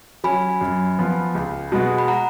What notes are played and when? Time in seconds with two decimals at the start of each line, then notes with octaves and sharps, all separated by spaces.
0.24 F#3 C#4 G#5 B5
0.61 F#2
0.99 F3 B3 F4
1.34 C#2
1.72 B2 G#3 B3 F#4
1.98 B5
2.08 F#5 A#5